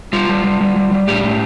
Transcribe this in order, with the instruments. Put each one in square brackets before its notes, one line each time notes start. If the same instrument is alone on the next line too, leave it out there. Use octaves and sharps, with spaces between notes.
[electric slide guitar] G3 F4
G3
G3
G3
G3
G3
A2 G4
A2